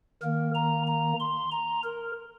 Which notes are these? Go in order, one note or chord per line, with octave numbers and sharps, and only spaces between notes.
D#3 A#3 A#4
A#5
A#5
C6
A#5
A#4